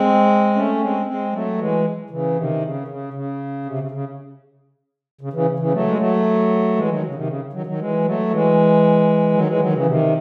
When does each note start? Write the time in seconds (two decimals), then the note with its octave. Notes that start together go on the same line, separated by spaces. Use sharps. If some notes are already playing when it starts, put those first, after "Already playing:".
Already playing: G#3 C4
0.55 A3 C#4
0.81 G#3 C4
1.07 G#3 C4
1.33 F#3 A3
1.58 E3 G#3
2.10 C#3 E3
2.36 C3 D#3
2.62 C#3
2.88 C#3
3.13 C#3
3.66 C3
3.78 C#3
3.91 C#3
5.21 C#3
5.33 C#3 E3
5.59 C#3 E3
5.72 F#3 A3
5.87 G#3
5.98 F#3 A3
6.76 E3 G#3
6.88 D#3 F#3
7.06 C#3
7.15 C3 D#3
7.27 C#3
7.53 D#3 F#3
7.66 D#3 F#3
7.79 E3 G#3
8.05 F#3 A3
8.30 E3 G#3
9.34 D#3 F#3
9.47 E3 G#3
9.60 D#3 F#3
9.73 C#3 E3
9.86 C3 D#3